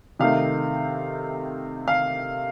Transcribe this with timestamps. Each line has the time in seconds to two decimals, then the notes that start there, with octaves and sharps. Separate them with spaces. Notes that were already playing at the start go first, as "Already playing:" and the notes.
0.19 C3 D#3 A3 F5
1.88 F5